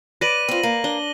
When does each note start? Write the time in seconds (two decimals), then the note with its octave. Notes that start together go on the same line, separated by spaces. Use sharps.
0.21 B4 D5 A#6 D#7 F#7
0.49 C4 F4
0.63 A#3
0.84 D4 G7